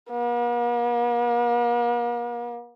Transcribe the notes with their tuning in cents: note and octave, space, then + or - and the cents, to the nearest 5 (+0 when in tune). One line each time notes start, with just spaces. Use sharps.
A#3 +45